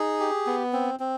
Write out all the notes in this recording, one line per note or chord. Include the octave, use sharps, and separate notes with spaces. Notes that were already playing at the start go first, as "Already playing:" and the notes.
Already playing: D#4 G#4
G4
B3
C4
C4